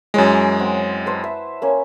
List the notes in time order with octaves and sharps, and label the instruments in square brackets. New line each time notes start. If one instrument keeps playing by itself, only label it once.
[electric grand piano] F#2 G#3 [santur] E4 C#5 G#5
[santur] C4 F#5
B4 C5 A5
E5
A#3 C#4